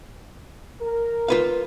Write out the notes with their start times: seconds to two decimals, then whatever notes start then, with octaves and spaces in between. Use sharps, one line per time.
0.81 A#4
1.28 F4 B4 F5